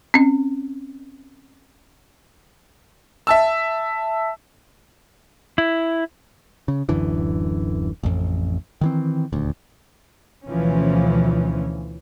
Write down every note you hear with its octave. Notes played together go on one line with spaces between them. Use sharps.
C4 C#4
E5 A5 E6
E4
C#3
D1 F#2 D3 E3
A1 F2
D#3 E3 C4
D#1 D2
D2 B2 E3 F3 C#4